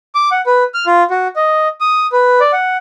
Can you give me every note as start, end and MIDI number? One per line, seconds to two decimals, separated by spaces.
0.15 0.30 86
0.31 0.41 78
0.46 0.64 71
0.74 0.85 89
0.87 1.03 65
1.10 1.28 66
1.36 1.68 75
1.81 2.07 87
2.12 2.40 71
2.40 2.52 74
2.53 2.77 78